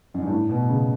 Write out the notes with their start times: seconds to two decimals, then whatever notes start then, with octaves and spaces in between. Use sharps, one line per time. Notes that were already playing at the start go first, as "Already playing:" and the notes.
0.14 F#2
0.23 G2
0.29 A2
0.49 B2
0.69 C#3